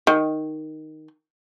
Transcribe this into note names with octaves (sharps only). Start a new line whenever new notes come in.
D#3